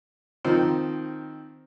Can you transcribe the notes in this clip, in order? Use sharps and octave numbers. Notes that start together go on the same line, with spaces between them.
D#3 F3 C4 D#4